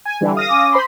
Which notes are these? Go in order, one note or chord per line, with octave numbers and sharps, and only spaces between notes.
G#5
D3 E3 G3
F5 D#6 A#6
C#4 G#5 D6
C5 B5 C6